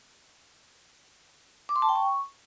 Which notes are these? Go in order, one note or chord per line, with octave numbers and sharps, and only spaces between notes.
D6
C6
A5
G5
C#6